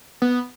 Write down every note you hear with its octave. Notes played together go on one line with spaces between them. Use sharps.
B3